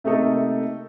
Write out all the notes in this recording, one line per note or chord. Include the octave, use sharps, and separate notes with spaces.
C3 A3 A#3 D#4 A4